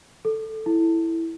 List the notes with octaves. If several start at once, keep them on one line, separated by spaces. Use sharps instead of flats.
A4
E4